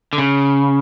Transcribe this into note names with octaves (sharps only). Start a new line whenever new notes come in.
D3
C#3